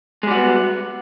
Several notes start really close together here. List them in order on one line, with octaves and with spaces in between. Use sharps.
G#3 G3 F#4 B3